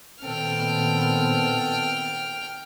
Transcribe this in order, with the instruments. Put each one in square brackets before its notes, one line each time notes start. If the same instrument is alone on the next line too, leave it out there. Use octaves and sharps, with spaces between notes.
[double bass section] A#2 D#3 B3 [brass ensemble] C4 A4 [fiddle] G5 F6